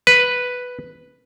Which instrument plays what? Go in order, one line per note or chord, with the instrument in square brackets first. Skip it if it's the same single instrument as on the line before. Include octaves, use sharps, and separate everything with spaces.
[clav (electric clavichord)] B4